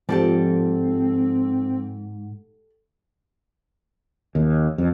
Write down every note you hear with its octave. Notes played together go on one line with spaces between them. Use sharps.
G#2 F3 C4 G4 A4 D5
D#2
F2